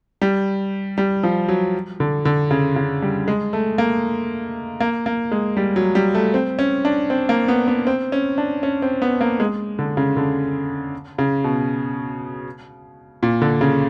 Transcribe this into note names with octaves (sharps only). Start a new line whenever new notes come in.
G3
G3
F3
F#3
D3
D3
C#3
C#3
G3
G#3
A3
A#3
A#3
A#3
G#3
G3
F#3
G3
A3
C4
C#4
D4
C4
A#3
B3
B3
C4
C#4
D4
C#4
C4
B3
A#3
G#3
D3
C#3
D3
C#3
B2
A#2
D3
C#3